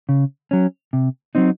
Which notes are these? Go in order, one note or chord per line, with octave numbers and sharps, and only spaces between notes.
C#3
F#3 C#4
C3
F#3 C4 D#4